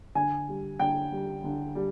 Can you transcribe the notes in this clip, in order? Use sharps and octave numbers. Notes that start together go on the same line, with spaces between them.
D3 G#5
G3
D3 G5
G3
D3
G3